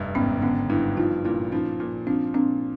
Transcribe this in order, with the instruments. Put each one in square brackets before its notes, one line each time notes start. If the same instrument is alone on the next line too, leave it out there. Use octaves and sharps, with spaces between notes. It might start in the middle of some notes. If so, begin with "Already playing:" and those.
Already playing: [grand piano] F1 G2
[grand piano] G#1 [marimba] B3 C#4
[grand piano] D3 [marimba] B3 C#4
[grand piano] G2 [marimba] D4 E4
[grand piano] F3 [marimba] D#4 F4
[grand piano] A#2 [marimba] D4 E4
[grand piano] F3 [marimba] C#4 D#4
[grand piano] A#2
[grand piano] F3 [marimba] C4 D4
[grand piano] A#2 [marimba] C4 D4